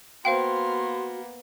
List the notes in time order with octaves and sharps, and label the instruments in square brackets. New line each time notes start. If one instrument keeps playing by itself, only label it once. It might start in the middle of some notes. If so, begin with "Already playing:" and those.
[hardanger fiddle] A#3 B3 [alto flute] F#4 [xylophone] C5 F5 G5 [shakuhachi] C6